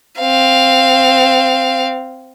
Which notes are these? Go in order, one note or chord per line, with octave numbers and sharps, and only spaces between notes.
C4 F5